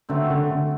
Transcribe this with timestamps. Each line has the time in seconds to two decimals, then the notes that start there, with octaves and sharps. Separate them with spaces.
0.09 D3 F#3 A3 C4
0.30 D3
0.50 D3